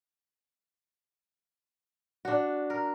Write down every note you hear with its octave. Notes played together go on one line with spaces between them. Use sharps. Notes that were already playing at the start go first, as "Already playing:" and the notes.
D4 F#4
A#4